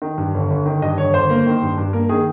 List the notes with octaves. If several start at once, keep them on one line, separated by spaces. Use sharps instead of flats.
D#3
G2
G1
G1
D#3
G2 D#5
G1 C#5
G1 C5
A#3
D#3
G2
G2
A#3 A#4
D#3 G#4